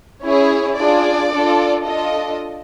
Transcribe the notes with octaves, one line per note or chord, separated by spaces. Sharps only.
C#4 E4 G#4 C#5
D4 F4 G#4 D5
D4 F4 A4
D4 F4 A4 D#5